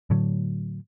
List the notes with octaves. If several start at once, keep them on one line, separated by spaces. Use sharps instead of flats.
A2 D3 F#3